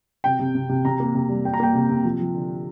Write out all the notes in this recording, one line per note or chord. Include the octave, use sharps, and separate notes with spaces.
C3 G5
C3
C3
C3
C3 A#5
A#3
C3
G3
A#3 G5
A#5
A#3 G5
C3
C3
F3
F3
D3